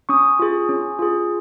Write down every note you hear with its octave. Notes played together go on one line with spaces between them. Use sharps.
C#4 C#6 D#6
F4 G#4
C#4
F4 G#4